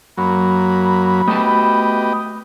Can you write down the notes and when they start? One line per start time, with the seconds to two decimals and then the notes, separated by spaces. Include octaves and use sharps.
0.18 F#2 F#3 A#3 B5
1.28 A3 B3 F#4 G4 D#5 A5